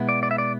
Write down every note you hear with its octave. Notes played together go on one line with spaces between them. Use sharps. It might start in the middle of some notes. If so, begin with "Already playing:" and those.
Already playing: B2 G#3 B3 E4
D5
D5
E5
D5